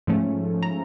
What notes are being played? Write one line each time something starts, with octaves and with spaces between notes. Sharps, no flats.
G#2 F3 A3 C#4
A#5